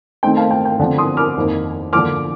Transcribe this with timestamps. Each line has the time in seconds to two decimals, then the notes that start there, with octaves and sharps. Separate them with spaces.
0.23 D#3 A3 C4 D#4 G5
0.37 F5 A5
0.51 G5
0.65 G5
0.79 D3 F3 C4
0.98 C6 D#6
1.17 D6 F6
1.37 F2 D#3 A#3 D#4
1.93 D3 F3 A#3 D6 F6